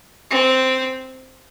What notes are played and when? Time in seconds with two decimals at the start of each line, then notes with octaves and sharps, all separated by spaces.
0.30 C4